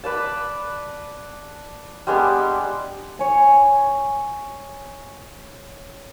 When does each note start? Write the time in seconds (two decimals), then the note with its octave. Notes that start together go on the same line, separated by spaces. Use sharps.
0.04 B4 D5 A5
2.07 G3 G#3 B3 D4
3.19 C#5 G#5